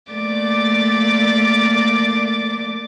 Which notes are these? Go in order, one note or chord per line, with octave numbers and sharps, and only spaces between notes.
A3 A#3 D5 D6 A6